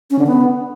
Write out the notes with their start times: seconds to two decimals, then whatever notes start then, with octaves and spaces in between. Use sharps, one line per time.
0.11 C#4
0.19 D3
0.27 B3